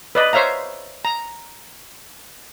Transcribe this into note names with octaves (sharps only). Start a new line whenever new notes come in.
B4 D5 D#5
C5 C#5 E5 F5 A#5
A#5